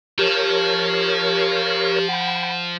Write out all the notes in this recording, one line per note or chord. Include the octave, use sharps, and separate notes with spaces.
F3 G4 A#4 C#5
F#5 G5 B5